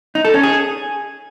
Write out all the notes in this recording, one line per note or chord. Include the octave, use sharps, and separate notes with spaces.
D#4
A4
C#4
G#4